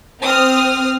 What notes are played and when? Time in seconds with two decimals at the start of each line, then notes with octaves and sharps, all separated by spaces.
0.23 C4 D#6 F6